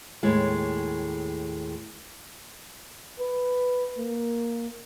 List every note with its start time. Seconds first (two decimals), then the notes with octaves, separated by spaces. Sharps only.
0.23 D#2 A2 G#3
3.20 B4
3.98 A#3